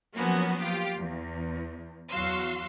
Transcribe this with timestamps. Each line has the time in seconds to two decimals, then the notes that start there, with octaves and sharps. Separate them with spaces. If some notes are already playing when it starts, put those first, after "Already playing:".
0.15 F3 F#3 A#3 B3 C#4 F#4
0.61 F4 G4
0.96 E2
2.10 E2 F#3 F#4 F5 C6 E6